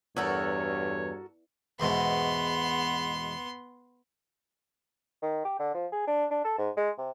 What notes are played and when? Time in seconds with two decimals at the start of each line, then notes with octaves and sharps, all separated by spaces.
0.16 E2 G2 F#4 A4 A#4 C#5
1.80 E2 G#2 B2 B3 C6
5.22 D#3
5.45 G4
5.59 D3
5.74 F3
5.92 G#4
6.07 D4
6.30 D4
6.44 A4
6.58 G#2
6.77 G#3
6.98 C3